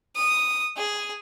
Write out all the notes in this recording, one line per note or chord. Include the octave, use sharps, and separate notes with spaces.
D#6
G#4